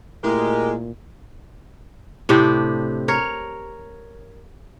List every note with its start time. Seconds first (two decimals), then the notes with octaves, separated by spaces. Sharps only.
0.24 A#2 G#3 A3 E4 G4 A#4
2.29 A2 C3 D4 G4
3.08 A#4 C#5